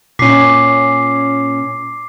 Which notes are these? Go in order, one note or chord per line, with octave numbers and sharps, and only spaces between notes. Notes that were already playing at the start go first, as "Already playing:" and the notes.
A#2 C#4 D6 B6 C7